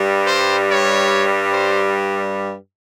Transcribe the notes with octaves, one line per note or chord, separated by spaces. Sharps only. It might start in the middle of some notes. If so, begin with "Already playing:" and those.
Already playing: G2 G3
C5
C#5
C5